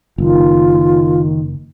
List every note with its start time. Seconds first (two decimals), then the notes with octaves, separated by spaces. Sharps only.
0.18 F#1 D#3 F4